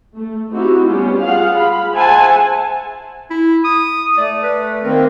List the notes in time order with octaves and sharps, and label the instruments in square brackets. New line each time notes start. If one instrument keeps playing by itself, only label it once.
[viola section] A3
C4 D#4 E4 F#4 G4
G3 B3 C#4 F4 G4
F4 G#4 F5 F#5
B5
G#4 C5 E5 F#5 G#5 A5
[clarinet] E4
D#6
[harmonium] A3 [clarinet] D5
[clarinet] B4
[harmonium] D#3 A#3 C4 [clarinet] A#4